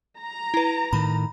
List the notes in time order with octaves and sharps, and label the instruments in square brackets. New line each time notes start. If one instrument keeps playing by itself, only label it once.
[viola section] A#5
[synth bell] E4 B4
[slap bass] A2 D#3 [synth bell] B5